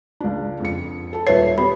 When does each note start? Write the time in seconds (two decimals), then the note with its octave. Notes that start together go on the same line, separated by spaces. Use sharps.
0.20 C#2 D4
0.60 F2 C#7
1.13 A4 A5
1.27 D#1 B4 C#5 E5 C7
1.58 B3 G4 B5